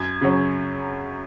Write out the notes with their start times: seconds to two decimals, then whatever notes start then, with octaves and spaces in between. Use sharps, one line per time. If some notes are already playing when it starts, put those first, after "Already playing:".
Already playing: F#2 G#6
0.21 C#3 F#3 C#4